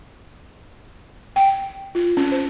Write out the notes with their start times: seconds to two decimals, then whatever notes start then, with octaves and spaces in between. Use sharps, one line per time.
1.36 G5
1.95 F4
2.17 C#4
2.32 C5